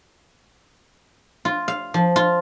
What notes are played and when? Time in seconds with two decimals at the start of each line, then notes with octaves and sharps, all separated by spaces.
1.45 F4
1.68 F5
1.94 F3
2.16 F4